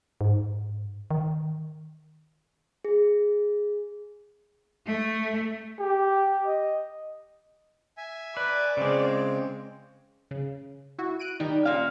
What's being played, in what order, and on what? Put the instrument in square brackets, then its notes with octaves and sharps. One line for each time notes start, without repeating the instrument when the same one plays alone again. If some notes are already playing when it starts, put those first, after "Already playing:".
[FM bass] G#2
D#3
[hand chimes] G#4
[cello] A3
[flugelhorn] G4
D#5
[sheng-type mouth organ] E5 G#5
[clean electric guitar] B4 [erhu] D5
[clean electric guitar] C#3 G#3 [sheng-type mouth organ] C4
[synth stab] C#3
E4 F#4
F#6 D7 D#7
[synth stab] D#3 D#4 [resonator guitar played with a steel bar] G3
[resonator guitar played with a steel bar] A#2 F5 [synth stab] C#4